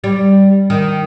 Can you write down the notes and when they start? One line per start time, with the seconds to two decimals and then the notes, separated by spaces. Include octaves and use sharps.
0.04 G3
0.70 D#3